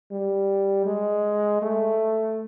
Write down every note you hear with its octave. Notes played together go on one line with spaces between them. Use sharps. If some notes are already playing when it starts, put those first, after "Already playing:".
G3
G#3
A3